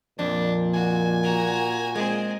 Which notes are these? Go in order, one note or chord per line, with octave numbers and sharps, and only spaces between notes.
F2 A#2 D4
F#4 G#5
F#4 A#5
G#3 C4 G#4